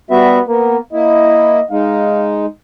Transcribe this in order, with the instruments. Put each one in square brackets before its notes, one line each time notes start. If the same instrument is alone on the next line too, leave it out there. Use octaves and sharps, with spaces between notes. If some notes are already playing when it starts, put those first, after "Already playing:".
[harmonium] G3 F#4 E5 [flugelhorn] B3
[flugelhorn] A#3 [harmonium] B3
[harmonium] A#3 E4 [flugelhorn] D#5
[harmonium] G#3 D#4 [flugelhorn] F5